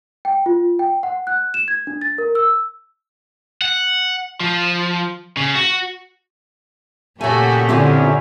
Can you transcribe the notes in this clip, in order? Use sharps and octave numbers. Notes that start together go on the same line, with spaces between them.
G5
F4
G5
F#5
F#6
E7
G#6
D4
A6
A#4
E6
F#5
F3
C#3
F#4
A#2 C#3 A3 F#4 G4 C#5 G#5
F#2 D3 C4 C#4 E4 F4